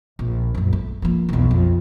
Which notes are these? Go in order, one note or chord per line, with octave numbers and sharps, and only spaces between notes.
A#1
A#1 F#2
A3
F3 A#3
B1 E2
F2